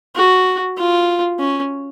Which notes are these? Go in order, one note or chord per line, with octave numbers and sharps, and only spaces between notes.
F#4
F4
C#4